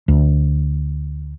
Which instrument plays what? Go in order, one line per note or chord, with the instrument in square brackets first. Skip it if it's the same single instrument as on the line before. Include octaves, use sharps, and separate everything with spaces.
[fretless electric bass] D2